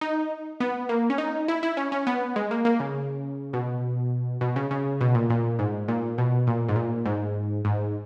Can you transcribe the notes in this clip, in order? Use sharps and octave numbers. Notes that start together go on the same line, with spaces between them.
D#4
B3
A#3
C#4
D#4
E4
E4
C#4
C#4
B3
G#3
A#3
A#3
C#3
B2
B2
C#3
C#3
B2
A#2
A#2
G#2
A#2
B2
A#2
G#2
A#2
G#2
G#2